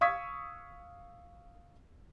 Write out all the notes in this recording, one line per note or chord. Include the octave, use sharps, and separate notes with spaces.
F5 C#6 D#6 E6 G#6 B6